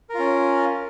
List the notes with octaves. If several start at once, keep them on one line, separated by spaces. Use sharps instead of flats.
C#4 F4 A#4